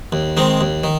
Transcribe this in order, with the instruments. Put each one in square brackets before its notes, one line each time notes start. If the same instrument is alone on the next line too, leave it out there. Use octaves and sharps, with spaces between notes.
[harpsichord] D#2
D#3 G#3 C4
D#2
D#3